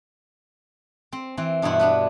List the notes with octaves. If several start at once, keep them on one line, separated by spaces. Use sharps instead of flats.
C4
E3 C4
G2 B2 B3 C4 E4 F#5
B3 D4 B4